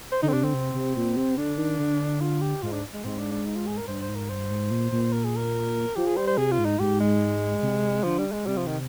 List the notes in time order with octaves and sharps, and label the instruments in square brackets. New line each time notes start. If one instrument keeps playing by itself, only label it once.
[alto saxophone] C5
[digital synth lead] D3 [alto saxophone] D#4
[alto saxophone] C4
[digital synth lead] C3 [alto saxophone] D4
[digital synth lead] D3 [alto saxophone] C4
[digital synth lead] C3
C3
A#2
C3
[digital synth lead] D3 [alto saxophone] D4
[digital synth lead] D#3
D3
[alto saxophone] F4
G4
[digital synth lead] G#2 [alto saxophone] F4
[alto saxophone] D4
G#3
[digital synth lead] G#2 [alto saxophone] C4
[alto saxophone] D4
D4
D#4
F4
G#4
A#4
[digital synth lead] G2 [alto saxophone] C5
[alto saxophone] C5
[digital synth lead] G#2
[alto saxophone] A#4
[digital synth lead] G2 [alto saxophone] C5
[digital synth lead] G#2
A#2
A#2
[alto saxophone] A#4
G#4
A#4
[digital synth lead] F3 [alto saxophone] G4
[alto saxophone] G#4
[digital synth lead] G3 [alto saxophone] C5
[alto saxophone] C5
[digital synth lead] C3 [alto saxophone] G#4
[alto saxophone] F4
[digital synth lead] G#2
[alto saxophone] D#4
[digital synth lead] G#2 [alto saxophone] G4
[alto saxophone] G#3
[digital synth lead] C3
[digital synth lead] D3 [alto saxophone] F3
[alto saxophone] G3
G#3
[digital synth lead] C3 [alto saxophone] G3
[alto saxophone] F3
D#3